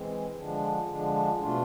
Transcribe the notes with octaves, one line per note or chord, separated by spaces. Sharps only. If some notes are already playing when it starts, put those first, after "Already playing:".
Already playing: E3 G#3 C4
D3 F3 G#3 D4
D3 F3 G#3 D4
B2 A3 D4 F4